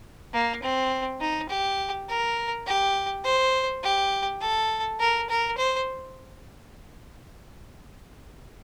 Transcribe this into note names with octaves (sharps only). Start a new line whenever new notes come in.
A#3
C4
D#4
G4
A#4
G4
C5
G4
A4
A#4
A#4
C5